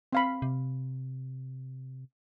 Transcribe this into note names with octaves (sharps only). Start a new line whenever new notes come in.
C4 F5 B5
C3